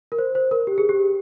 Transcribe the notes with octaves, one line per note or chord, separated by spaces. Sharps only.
A#4
C5
C5
A#4
G4
G#4
G4